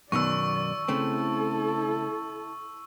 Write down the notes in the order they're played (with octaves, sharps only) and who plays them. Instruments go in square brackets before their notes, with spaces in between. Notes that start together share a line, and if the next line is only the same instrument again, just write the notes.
[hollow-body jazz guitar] F#2 B2 D#3 [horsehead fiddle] D5 [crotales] C#6 E6
[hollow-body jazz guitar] C#3 A3 C4 [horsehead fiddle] E4 A4